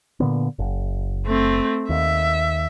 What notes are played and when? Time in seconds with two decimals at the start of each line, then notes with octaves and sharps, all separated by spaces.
0.20 A#2 D3 B3
0.59 F#1
1.26 A3 C4
1.89 D#2 E5